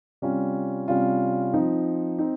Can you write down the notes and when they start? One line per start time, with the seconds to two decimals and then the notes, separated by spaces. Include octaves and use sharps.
0.22 C3 G3 C#4 F4
0.88 C3 G3 C#4 F4
1.54 F3 C4 D#4
2.19 C4 D#4